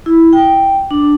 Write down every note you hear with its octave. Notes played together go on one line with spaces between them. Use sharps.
E4
G5
D4